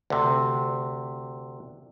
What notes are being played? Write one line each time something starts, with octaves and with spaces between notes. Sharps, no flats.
D2 C3